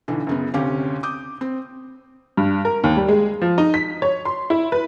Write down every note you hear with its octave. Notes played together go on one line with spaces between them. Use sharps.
B1 D3 E3
F#2 C#3 B3
D2 C3 C#4 G4 F5
D6 D#6 G6
C4
G2
A#4
D#2
G3
G#3
F3
D#4
B6
C#5
C6
E4
B4